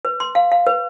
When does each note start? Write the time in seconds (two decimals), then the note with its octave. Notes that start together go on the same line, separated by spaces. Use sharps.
0.05 B4
0.20 C6
0.35 F5
0.52 F5
0.66 B4